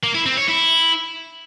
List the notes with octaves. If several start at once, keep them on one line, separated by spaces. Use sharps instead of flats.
A#3
E4
C4
C#5
E4